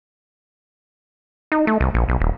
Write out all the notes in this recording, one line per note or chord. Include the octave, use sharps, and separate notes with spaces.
D#4
A3
C2
A#1
B1
D#1